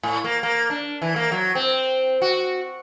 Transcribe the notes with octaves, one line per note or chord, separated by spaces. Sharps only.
A2
A#3
A#3
D4
E3
A#3
F#3
C4
F#4